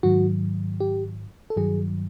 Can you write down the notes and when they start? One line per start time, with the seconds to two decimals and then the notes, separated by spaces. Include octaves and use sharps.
0.03 G#2 D#3 F#3 F#4
0.80 G4
1.50 A4
1.56 G2 D#3 F#3 G#4